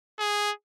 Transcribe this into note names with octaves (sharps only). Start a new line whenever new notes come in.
G#4